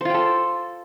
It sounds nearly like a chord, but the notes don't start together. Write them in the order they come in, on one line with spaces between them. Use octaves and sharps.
C5 F4 G5 A4